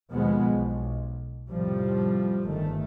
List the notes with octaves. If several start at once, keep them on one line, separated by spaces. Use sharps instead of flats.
D#2 B2 F3 G#3 B3
B1
F2 A2 C3 F3 G3
G1 D#3 A3